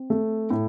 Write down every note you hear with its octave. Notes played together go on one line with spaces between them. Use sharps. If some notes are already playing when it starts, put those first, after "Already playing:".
Already playing: C4
A3
A2